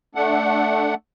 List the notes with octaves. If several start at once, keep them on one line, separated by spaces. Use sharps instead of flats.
A3 D4 F#5